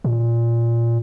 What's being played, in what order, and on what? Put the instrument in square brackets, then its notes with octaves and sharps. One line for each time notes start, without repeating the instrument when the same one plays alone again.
[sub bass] A#2